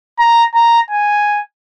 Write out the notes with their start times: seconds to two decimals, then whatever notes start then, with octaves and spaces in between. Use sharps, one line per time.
0.19 A#5
0.55 A#5
0.91 G#5